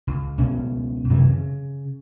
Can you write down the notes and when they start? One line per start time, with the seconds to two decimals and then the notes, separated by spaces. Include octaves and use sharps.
0.07 C#2
0.38 C#2 B2 C#4
1.10 F#2 C3 D#3 E3
1.29 C#3